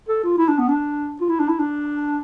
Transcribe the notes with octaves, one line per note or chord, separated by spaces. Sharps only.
A4
F4
E4
D4
B3
D4
F4
E4
D4
E4
D4